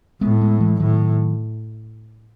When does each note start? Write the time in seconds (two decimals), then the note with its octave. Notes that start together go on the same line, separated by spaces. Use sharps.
0.21 A2 G#3 B3
0.41 G#3 B3
0.60 E3 G#3
0.80 A2 D#3 F#3